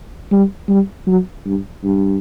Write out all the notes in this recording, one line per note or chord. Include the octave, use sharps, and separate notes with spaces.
G3
G3
F#3
G2
G2